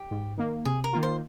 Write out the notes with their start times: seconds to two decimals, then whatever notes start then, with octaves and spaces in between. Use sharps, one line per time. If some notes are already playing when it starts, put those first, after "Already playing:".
Already playing: G4
0.11 G#2
0.38 D#3 A#3
0.65 C3 G#4
0.84 A#4
0.93 D#3 A#3 F4
1.03 C5